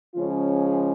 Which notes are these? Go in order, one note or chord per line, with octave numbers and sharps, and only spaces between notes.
C#3 F3 G#3 C#4 F4
G#4